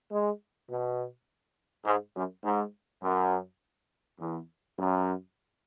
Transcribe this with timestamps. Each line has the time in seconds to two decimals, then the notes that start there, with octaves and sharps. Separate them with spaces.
0.12 G#3
0.69 B2
1.86 G#2
2.15 F#2
2.44 G#2
3.02 F#2
4.19 E2
4.77 F#2